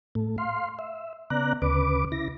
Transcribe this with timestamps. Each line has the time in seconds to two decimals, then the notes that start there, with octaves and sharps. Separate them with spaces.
0.15 A2 A3
0.38 F5 C6
0.79 E5
1.30 C#3 B3 D5 A#5 F#6
1.62 D2 C#3 B4 D6
2.12 C#3 E4 A#6